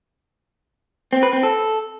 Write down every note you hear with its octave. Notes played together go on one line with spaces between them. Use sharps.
C4
B4
C4
A4